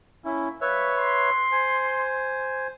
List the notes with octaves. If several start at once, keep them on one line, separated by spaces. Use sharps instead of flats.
A#3 C#4 E4 E5
G3 B4 C#5 E5 F5 C#6
C6
C5 G#5